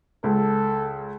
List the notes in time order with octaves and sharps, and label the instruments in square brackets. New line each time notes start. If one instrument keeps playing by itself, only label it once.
[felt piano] C#2 [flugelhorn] A4